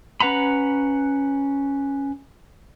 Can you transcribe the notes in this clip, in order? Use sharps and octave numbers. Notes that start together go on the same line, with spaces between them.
C#4 B4 F#5 A#5 B5